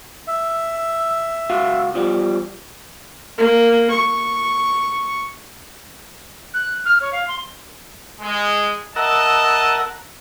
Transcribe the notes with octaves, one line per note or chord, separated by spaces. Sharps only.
E5
C#2 F#4 F5
E2 F3 G3
A#3
C#6
F#6
F6
C#5
F5
C6
G#3
A#4 D#5 E5 F#5 A5